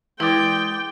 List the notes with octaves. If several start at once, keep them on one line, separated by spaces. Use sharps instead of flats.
E3 G#3 E4 B4 D5 G5